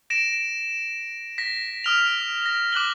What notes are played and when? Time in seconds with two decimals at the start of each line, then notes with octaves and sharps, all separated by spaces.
0.10 A#6 D7 E7
1.38 A#6 B6
1.84 D#6 F6 F7
2.46 A#6
2.72 D6 F#6 F#7 G7